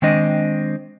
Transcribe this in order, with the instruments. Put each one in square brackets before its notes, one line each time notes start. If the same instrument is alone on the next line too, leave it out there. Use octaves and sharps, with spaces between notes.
[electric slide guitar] D#3 G#3 C4 D4 D#5